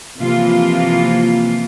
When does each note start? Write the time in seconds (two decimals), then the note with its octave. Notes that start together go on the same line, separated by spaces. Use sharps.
0.19 C3 E3 F3 A#3 F4